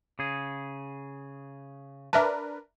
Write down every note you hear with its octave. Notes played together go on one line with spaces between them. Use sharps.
C#3 G#4
D4 A#4 B4 E5 A5